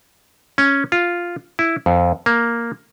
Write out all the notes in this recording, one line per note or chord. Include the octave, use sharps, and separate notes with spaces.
C#4
F4
E4
F2
A#3